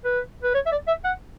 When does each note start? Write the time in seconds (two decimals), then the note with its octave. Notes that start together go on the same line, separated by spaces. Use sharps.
0.05 B4
0.43 B4
0.54 C#5
0.66 E5
0.72 D5
0.87 E5
1.04 F#5